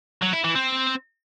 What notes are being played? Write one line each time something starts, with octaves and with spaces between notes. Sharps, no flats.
F#3
E4
E3
C4